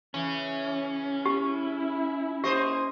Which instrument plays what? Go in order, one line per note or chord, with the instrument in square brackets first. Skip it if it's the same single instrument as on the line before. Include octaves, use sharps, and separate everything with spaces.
[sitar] C#3 E3 [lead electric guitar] C#4
[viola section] E4 [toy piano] G4
[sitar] A#3 C5 D#5 [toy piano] G4